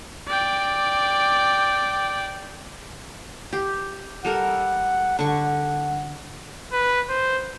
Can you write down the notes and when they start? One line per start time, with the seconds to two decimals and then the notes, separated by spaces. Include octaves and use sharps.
0.28 D5 G5
3.53 G4
4.25 G3 A4 A#4 F#5
5.19 D3 F#5 C#6
6.73 B4
7.09 C5